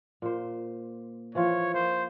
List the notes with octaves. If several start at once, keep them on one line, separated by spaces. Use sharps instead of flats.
A#2 C5
E3 F3 F4 C#5
A#3 C5